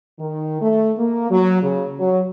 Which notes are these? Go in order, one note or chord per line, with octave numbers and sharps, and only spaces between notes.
D#3
A3
A#3
F#3
C#3
F#3